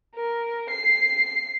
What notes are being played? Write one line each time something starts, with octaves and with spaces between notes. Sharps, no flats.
A#4
C7